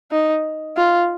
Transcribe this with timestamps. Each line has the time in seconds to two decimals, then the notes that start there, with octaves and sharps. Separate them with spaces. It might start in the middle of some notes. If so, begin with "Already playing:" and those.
0.12 D#4
0.77 F4